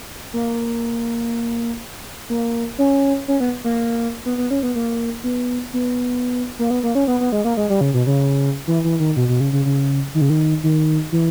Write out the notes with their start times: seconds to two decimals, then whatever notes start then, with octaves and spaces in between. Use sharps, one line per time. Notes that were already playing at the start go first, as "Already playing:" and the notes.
0.34 A#3
2.30 A#3
2.78 C#4
3.28 C#4
3.40 B3
3.64 A#3
4.26 B3
4.38 B3
4.51 C#4
4.63 B3
4.75 A#3
5.24 B3
5.74 B3
6.59 A#3
6.71 B3
6.83 A#3
6.95 C#4
7.08 B3
7.20 B3
7.32 G#3
7.45 A#3
7.57 G#3
7.70 G3
7.81 C#3
7.94 B2
8.07 C#3
8.67 E3
8.84 E3
9.00 D#3
9.16 B2
9.29 B2
9.40 C#3
9.53 C#3
9.65 C#3
10.15 D#3
10.21 C#3
10.30 D#3
10.63 D#3
11.12 E3